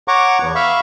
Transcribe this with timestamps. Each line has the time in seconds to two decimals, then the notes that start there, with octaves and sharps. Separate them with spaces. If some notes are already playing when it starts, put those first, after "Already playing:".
0.08 C#5 F#5 A#5 C#6 D6
0.42 E2 B3
0.55 E5 F5 B5 C#6